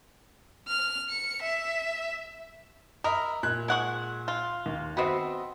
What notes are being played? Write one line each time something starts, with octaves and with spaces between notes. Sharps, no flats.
F6
C#7
E5
A#4 D#5 E5 B5
A#2 F#6 G#6
G#3 F#5 C#6
F4
D#2
B3 C4 F#4 D#5 E5